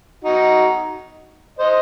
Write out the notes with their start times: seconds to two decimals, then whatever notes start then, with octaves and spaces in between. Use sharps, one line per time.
0.24 D#4 F#4
1.59 C5 D#5